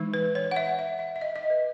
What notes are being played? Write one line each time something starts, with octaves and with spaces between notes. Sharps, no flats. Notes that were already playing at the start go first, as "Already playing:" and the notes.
Already playing: E3 G#3 D#4
B4
C#5
F#5
E5
E5
E5
E5
D#5
D#5
B4